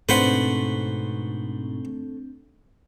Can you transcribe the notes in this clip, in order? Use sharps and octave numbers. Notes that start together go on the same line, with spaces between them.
G#2 B2 A3 C4 D4 B4 C5 F#5